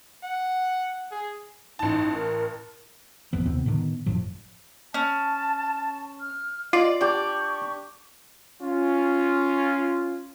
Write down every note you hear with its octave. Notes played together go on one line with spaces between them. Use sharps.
F#5
G#4
A1 D#4 A5
A#4
A1 F2 F3 B3
D#2 C3 B3 C4
A2 D3 D#3 B3
G1 F#2 A2 F3
C#4 A5
F6
F4 D5 D#5
D4 G4 D5 C#6
C#4 F4